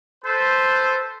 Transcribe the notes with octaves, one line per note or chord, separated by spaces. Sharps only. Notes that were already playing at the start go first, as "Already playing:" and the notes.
A4 B4 C5